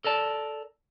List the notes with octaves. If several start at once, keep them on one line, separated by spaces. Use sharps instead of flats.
A4 A#4 D5 A5